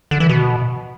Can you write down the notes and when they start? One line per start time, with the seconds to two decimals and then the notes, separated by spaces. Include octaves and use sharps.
0.11 D3
0.20 E3
0.29 B2